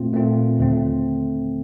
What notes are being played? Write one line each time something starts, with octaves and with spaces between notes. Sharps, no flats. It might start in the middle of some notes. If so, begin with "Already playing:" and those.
Already playing: A#2 A3 C4 F4
A#2 A3 C4 F4
D#2 D3 A3 C4